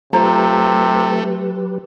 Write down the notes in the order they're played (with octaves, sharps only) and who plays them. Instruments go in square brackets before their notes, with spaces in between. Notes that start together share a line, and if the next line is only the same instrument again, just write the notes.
[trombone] C3 [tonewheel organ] F#3 G4 B4 [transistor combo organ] A3 [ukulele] F4 C5 A#5